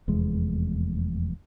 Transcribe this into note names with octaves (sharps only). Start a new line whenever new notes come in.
F1 E2 G#3